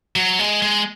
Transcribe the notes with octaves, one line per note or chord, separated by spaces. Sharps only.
F#3
G#3
G#3